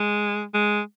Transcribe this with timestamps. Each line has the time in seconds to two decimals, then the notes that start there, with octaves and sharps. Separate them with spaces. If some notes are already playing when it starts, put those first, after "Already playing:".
Already playing: G#3
0.54 G#3